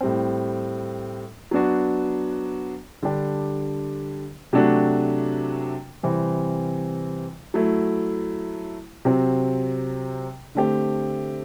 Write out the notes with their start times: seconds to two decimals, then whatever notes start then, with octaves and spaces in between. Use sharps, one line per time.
0.01 A2 G3 C4
1.51 F#3 B3 D4 F#4
3.03 D3 G3 D4 G4
4.53 C3 F#3 A3 D4 F#4
6.03 C3 E3 G3 C4
7.54 F#3 A3 E4
9.05 C3 F#3 C4
10.55 D3 A3 C4 G4